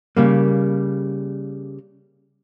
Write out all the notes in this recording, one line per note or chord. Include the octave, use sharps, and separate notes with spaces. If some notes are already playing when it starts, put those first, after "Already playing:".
C#3 G3 A#3